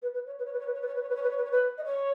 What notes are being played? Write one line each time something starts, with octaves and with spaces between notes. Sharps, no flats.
B4
B4
C#5
B4
C#5
B4
C#5
B4
C#5
B4
C#5
B4
C#5
B4
C#5
B4
C#5
B4
C#5
B4
D#5
C#5